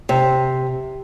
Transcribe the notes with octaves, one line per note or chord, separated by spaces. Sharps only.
C3